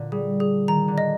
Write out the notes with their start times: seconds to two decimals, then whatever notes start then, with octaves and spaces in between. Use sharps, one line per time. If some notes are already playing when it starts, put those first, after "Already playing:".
Already playing: A#2 D3
0.12 G3 G#4
0.40 G#4
0.68 D#3 A#5
0.88 D3
0.98 D#5